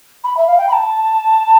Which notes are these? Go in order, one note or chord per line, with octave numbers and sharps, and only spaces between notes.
B5
E5
F5
G5
B5
A5